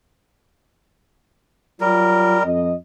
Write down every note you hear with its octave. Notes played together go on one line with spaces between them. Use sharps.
F#3 G3 F4 A#4
F2 D#5